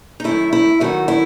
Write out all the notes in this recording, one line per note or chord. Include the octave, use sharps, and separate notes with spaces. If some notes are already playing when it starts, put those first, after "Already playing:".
D#4
F#2 D#3 A3 E4
E4
F#2 D#3 A3 F#4
E4